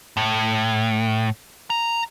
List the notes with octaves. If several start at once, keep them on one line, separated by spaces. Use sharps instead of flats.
A2
A#5